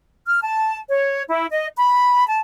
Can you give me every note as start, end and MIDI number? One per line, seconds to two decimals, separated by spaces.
0.25 0.40 89
0.44 0.77 81
0.88 1.22 73
1.29 1.46 64
1.51 1.66 75
1.76 2.26 83
2.28 2.39 81